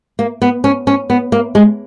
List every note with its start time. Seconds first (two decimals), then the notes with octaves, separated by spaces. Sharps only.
0.19 A#3
0.42 B3
0.64 C#4
0.87 C#4
1.10 B3
1.32 A#3
1.55 G#3